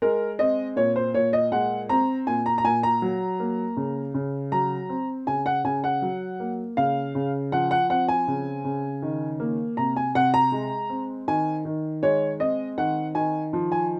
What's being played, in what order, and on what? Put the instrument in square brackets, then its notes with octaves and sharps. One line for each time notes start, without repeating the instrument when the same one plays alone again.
[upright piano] G#3 A#4
C4 D#5
A#2 C#5
C5
A#2 C#5
D#5
G#3 F#5
C4 A#5
A#2 G#5
A#5
A#5
A#2 G#5
A#5
F#3
A#3
C#3
C#3
F#3 A#5
C4
C#3 G#5
F#5
C#3 G#5
F#5
F#3
A#3
C#3 F5
C#3
F3 F#5
F#5
C4 F#5
G#5
C#3
C#3
D#3
A#3
C3 A#5
G#5
C3 F#5
A#5
G#3
C4
D#3 G#5
D#3
G#3 C#5
C4 D#5
D#3 F#5
D#3 G#5
F3
G#5